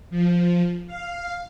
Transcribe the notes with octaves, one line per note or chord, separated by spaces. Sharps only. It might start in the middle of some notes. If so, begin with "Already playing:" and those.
F3
F5